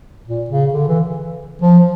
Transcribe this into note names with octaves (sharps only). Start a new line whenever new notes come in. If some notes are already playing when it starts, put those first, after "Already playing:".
A#2
C#3
D3
E3
F3